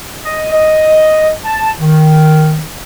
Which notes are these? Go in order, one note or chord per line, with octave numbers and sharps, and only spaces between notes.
D#5
D#5
A5
D#3